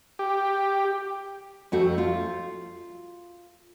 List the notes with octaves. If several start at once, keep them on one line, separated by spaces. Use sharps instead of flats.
G4
F2 A3 F#4
F4